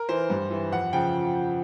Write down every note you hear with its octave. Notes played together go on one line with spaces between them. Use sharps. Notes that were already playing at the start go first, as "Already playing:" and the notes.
Already playing: A#4
E3 C5
G2
E3
F2 F#5
C#3 F3 G5